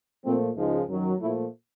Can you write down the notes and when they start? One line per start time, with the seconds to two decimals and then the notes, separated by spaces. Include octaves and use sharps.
0.25 A#2 F3 A3 C4
0.57 C#2 C#3 F3 G#3 D#4
0.88 F#2 D#3 F#3
1.20 A#2 F3 A3 E4